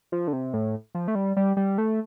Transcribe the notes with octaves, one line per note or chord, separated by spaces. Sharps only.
F3
D3
C3
A2
F3
A3
G3
G3
G3
A3